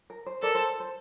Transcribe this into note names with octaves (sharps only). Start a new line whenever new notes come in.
A#4
C5
A4 A#4 D5
C5
C5